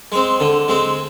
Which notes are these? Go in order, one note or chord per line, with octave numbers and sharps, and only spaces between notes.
G#3 C4
D3
G#3 C4